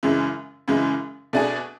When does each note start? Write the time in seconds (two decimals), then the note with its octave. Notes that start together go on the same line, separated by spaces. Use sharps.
0.03 F#2 C#3 E3 G#3
0.68 F#2 C#3 E3 G#3
1.33 B2 A3 D4 G#4